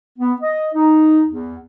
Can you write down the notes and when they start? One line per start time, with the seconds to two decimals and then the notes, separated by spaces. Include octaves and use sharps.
0.19 B3
0.41 D#5
0.74 D#4
1.26 E2